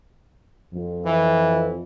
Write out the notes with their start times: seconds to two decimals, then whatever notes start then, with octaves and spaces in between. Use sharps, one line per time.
0.74 F2
1.05 E3